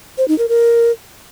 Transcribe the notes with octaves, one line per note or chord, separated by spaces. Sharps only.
C5
D#4
A#4
A#4